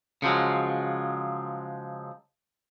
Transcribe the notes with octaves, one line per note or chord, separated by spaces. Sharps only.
C#3 F3 F#3 G#3